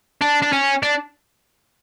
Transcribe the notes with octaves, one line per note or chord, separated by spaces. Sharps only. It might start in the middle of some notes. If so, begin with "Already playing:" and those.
D4
D4
C#4
D4